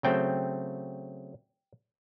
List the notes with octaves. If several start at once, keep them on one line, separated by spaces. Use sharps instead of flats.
C#3 F#3 A3 C4 G5